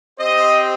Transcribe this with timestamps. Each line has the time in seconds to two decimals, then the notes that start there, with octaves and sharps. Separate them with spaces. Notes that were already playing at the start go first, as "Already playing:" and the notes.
0.19 C4 G4 C5 D#5